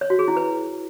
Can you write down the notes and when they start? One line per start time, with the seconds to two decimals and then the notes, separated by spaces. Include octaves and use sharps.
0.01 C#5
0.10 F#4
0.19 G#4
0.28 E4
0.37 B4